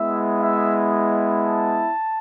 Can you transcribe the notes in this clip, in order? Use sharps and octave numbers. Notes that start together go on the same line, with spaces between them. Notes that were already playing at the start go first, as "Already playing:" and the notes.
Already playing: G#3 B3 E4 E5
E5
D#5
A5